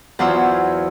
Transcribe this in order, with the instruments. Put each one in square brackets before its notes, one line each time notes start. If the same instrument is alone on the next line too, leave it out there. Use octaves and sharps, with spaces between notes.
[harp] E2 F#3 F4 C5 E6